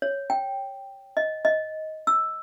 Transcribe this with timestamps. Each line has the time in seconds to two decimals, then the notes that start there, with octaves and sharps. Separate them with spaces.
0.02 C#5
0.30 G5
1.17 D#5
1.45 D#5
2.07 E6